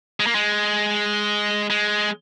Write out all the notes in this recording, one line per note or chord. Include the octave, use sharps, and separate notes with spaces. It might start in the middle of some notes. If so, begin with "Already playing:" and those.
G#3
A#3
G#3
G#3